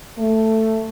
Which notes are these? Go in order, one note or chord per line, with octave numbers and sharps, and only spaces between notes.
A3